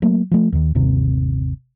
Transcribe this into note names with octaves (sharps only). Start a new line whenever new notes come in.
F#3 A3 A#3
F3 A3
D#2 D#3
G1 D#2 C3